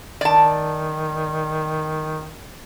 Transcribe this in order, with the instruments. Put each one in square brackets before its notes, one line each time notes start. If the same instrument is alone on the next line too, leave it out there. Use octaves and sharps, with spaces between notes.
[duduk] D#3 [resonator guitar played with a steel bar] D5 A5